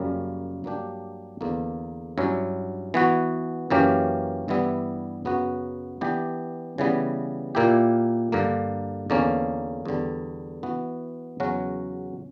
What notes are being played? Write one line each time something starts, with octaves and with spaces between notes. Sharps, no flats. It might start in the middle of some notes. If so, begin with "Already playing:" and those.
Already playing: F#2 C#3 G3 A#3 C#4
G2 F#3 A#3 D4 G4
E2 D3 A#3
G2 F#3 C#4 E4
E3 B3 F#4
F#2 E3 A#3 C#4 G4
G2 E3 G3 B3 E4
F#2 C#3 F#3 B3 F#4
E3 B3 D4 G4
C#3 E3 G3 B3
A#2 A#3 E4 G4
G2 D3 A#3
E2 D3 A#3 C#4
E2 D3 G3
E3 B3 F#4
E2 C#3 F#3 C#4 F#4